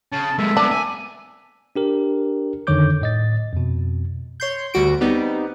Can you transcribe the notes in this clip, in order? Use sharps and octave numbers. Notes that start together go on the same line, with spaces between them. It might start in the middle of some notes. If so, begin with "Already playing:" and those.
C#3 A5
G#3 A#3 E5
A#3 B3 D4
G#5
D4 G4 A#4
F2 D3 D#3 C#5 D6 G6
A2 D#5 A6
F2 B2
C#5 C6 G6
D2 G3 F#4 D7
G3 B3 C4 D#4